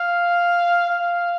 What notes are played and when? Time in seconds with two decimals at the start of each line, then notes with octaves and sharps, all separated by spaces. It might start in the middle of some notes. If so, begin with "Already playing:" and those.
Already playing: F5
0.90 F5